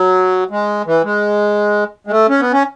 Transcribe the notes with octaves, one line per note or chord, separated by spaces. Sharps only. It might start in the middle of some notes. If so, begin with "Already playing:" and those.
Already playing: F#3
G#3
E3
G#3
G#3
A3
C#4
B3
C#4